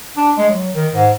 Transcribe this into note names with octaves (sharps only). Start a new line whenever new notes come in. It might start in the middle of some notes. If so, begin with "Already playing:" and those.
D4
G#3
F#3
D#3
G#2